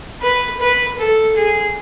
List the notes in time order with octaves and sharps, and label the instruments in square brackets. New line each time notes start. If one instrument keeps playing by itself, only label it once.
[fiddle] B4
B4
A4
G#4